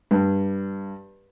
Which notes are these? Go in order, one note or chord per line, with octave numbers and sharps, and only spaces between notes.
G2